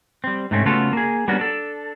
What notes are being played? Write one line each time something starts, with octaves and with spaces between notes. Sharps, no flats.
G3 C4
G#2 C3 A3 C4 C#4
C#3 A3 B3 F4 F#4 A4
A#3 G#4
G3 A#3 B3 C#4 D4 F#4
D4 A4